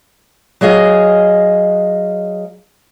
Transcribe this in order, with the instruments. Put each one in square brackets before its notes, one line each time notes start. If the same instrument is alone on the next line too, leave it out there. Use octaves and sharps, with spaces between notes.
[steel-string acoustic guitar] F#3 G#4 D#5 F5